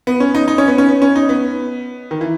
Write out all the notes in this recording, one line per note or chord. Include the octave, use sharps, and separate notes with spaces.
B3
C#4
D#4
D#4
C#4
B3
C#4
B3
C#4
D#4
B3
D#3
E3